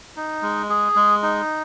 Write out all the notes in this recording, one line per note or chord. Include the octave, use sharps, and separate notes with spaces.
D#4
G#3
G#4
G#3
D#4